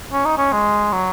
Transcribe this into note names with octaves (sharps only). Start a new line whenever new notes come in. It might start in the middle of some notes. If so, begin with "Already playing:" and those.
C#4
D#4
C#4
G#3
F#3